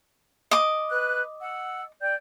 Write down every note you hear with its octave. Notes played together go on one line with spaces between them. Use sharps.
D#5 D6
B4 F#6
F#5 E6
D5 G5 G6